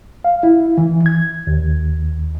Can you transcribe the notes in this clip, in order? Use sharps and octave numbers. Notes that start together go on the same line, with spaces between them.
F5
E4
E3
G#6
D#2